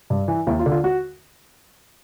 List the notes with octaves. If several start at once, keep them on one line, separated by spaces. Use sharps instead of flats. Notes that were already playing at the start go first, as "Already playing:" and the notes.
G2
E3
D#2 E4
F4
D3
F4
F#4